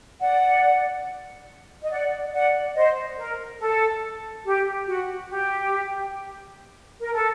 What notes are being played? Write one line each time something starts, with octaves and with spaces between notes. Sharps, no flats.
D5 F#5
D#5
D5 F#5
D5 F#5
C5 D#5
A#4
A4
G4
F#4
G4
A#4
A4